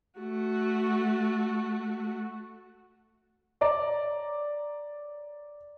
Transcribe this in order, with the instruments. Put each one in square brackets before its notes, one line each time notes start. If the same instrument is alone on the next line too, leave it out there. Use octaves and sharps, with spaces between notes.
[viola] A3 F#4
[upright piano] C#5 D5 A#5 D6